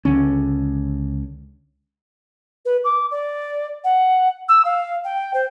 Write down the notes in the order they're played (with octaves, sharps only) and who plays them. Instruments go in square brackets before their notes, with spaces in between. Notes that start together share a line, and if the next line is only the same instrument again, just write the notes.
[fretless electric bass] C#2 D3 C#4
[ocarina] B4
D6
D5
F#5
E6
F5
G5
C5